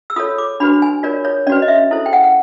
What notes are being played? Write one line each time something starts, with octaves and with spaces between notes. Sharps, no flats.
E6
F4 A4 C#5 D#6
D6
D4 F#4 B4 B5
G#5
F4 A#4 C#5 D5
C#5
C#4 F#4 B4 D5
D#5
E5
E4 A4 C5
G5
F#5
F#5